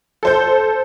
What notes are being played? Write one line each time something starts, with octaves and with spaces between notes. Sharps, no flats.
A4 C5 G6